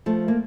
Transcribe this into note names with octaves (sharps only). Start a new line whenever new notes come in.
F3 A3
A#3